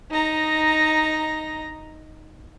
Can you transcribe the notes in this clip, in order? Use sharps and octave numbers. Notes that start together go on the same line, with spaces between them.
D#4 A#5